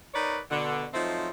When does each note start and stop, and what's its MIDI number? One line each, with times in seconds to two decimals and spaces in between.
0.14 0.39 63
0.14 0.39 70
0.14 0.39 71
0.14 0.39 73
0.14 0.39 74
0.50 0.86 47
0.50 0.86 50
0.94 1.29 53
0.94 1.29 54
0.94 1.29 57
0.94 1.29 60
0.94 1.29 63